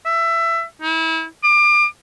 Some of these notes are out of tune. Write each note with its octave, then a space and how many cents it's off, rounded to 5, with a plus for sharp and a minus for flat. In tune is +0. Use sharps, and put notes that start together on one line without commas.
E5 +20
E4 -30
D6 +30